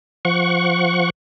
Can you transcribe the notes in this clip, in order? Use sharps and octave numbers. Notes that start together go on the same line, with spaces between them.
F3 F#5 C#6